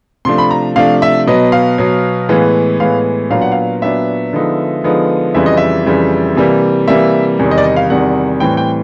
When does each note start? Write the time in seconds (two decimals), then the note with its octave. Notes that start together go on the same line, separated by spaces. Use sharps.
0.25 C3 F3 A3 D4 C6
0.38 B5
0.51 A#5
0.76 C3 F3 A3 D4 F5
1.02 E5
1.27 B2 F#3 B3 D#5
1.52 F5
1.78 B2 F#3 B3
2.29 A2 E3 G#3 B3
2.80 A2 E3 G#3 B3 F5
3.30 A#2 F#3 B3 D4 F5
3.41 F#5
3.52 F5
3.82 A#2 F#3 B3 D4 E5
4.33 D3 F3 G#3 B3 D#4
4.84 D3 F3 G#3 B3 D#4
5.34 F2 C#3 E3 G3 E5
5.46 D#5
5.57 E5
5.86 F2 C#3 E3 G3
6.37 C3 E3 G3 A#3
6.88 C3 E3 G3 A#3 E5
7.39 E2 C3 D#3 G3
7.51 D#5
7.58 D5
7.64 D#5
7.76 F5
7.90 E2 C3 D#3 G3 F#5
8.40 A2 E3 G3 C4 G5
8.57 G5